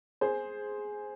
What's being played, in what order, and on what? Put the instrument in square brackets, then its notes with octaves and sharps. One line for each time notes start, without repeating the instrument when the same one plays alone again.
[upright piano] G#4 C5